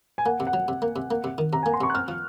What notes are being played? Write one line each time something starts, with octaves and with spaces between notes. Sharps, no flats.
G#5
A#3 F#5
C3
F#5
F#3
C3
A#3
C3
A#3
C3
D#3
C3 A#5
G#5
A#3
C6
C3 C#6
F#6
C4 F6
F3